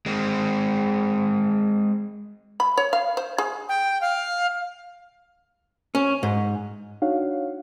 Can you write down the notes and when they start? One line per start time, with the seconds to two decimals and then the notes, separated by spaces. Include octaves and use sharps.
0.06 G#3 C4
2.60 B5
2.77 C#5
2.93 F5
3.17 C5
3.38 G#4
3.69 G5
4.01 F5
5.95 C#4
6.23 G#2
7.02 D4 D#4 F#4 C#5 F5 F#5